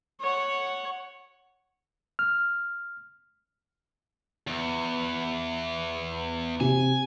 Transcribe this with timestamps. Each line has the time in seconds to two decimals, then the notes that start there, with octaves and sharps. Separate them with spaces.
0.20 C#5 F#5
2.19 F6
4.47 E2
6.60 C3 G#5